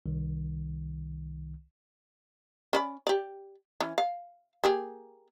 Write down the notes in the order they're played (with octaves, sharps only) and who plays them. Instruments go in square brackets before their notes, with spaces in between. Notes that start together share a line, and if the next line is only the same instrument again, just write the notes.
[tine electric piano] C2 D#3
[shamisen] C#4 D5 B5
G4 D5
E3 C#4
F5
A#3 G4 G#4